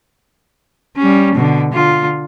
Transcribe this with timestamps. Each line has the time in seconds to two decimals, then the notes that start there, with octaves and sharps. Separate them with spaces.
0.97 G3 C#4
1.35 B2 D3
1.73 D3 F4